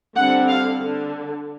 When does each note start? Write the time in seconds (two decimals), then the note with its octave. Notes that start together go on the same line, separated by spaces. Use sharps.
0.16 D3 G3 C4 F#5
0.48 F5
0.80 D3